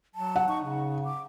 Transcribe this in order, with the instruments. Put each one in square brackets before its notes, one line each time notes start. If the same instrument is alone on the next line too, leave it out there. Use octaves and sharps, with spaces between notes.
[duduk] F#3 [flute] A5
[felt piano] F#5
[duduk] D#4 [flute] C#6
[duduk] C#3 [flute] D#4
[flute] D6